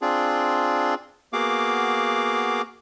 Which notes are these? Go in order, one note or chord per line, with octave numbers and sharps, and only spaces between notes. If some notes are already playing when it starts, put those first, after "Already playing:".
C4 D4 F4 G#4
A#3 B3 F#4 G#4 F5 D6